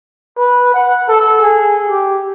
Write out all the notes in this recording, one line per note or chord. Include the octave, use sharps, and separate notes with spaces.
B4
F#5
A4
G#4
G4